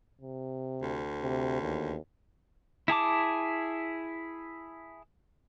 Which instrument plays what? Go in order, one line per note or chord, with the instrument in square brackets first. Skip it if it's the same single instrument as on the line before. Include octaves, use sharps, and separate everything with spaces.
[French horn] C3
[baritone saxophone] D2
[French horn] C3
D#2
[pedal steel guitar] E4 G#4 A5 D6